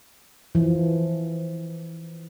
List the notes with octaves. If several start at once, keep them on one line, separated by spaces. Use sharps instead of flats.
E3 F3